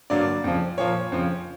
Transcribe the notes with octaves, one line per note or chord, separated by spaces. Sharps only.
G2 D3 F#3 A#3 D5
F2 C#3 F3
A#2 F3 A#3 C#5
F2 C#3 F3